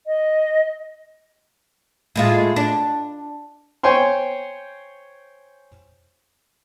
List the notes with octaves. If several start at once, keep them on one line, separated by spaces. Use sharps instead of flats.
D#5
A2 G#3 F4
D4
C5 C#5 G5 G#5 C6 C#6